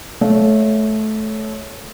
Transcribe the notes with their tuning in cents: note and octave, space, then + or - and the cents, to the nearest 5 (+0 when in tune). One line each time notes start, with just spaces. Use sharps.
A3 -20 C#5 +0 F5 +0